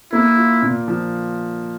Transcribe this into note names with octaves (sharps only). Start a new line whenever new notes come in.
A#3 E4
F4
A#2
F3